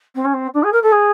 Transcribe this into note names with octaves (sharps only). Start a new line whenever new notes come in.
C4
C#4
C4
D4
G#4
A#4
A4
G#4